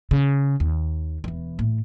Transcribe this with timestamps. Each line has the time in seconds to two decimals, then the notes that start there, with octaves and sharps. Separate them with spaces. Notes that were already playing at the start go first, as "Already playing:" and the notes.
0.11 C#3
0.60 D#2
1.24 E1 E3
1.59 A2